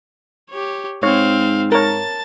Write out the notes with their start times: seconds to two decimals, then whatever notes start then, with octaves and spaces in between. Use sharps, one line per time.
0.50 G4 C#5
1.03 G#2 C4 C#5 F5
1.72 A#4 C#5 A5 A6